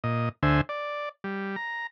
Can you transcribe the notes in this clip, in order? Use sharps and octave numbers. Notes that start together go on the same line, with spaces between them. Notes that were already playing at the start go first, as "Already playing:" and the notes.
A#2 D#5
D2 D3 C5 E5 G#5
D5
G3
A#5